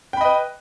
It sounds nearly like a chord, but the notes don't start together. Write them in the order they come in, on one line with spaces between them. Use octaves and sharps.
G5 B5 D#5 B4